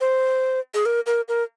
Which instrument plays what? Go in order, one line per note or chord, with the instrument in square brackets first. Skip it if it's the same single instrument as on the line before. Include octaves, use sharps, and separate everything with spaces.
[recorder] C5
G#4
A#4
A#4
A#4